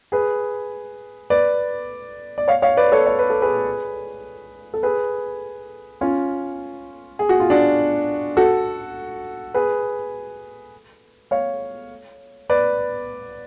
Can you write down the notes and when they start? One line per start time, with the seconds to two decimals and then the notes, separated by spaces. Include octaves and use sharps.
0.12 G#4 B4
1.30 B4 D5
2.38 D5
2.48 C#5 F5
2.62 C#5 F5
2.77 B4 D5
2.92 A4 C#5
3.07 C#5
3.19 B4
3.30 A4
3.42 G#4 B4
4.74 A4
4.83 G#4 B4
6.01 C#4 F4
7.19 G#4
7.29 F#4
7.40 F4
7.50 D4 F#4
8.37 F#4 A4
9.54 G#4 B4
11.31 C#5 F5
12.49 B4 D5